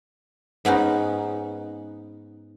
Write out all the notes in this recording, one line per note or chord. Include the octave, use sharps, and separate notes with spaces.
G#2 B3 C#4 D#4